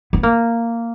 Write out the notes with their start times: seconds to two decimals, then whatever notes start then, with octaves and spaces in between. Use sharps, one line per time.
0.13 B3
0.23 A#3